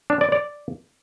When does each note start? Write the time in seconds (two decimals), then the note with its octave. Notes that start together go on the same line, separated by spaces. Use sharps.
0.10 D4
0.21 D5
0.32 D5